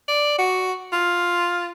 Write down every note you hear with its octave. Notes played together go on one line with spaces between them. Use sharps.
D5
F#4
F4